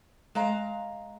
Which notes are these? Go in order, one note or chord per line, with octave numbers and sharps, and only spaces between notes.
G#3 F5 A#5